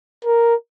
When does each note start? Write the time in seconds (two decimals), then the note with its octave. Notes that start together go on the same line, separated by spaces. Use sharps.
0.25 A#4